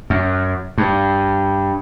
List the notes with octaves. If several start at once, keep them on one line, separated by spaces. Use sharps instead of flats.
F#2
G2